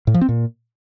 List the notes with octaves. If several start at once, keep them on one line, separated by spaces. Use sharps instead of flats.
A2
F3
C4
A#2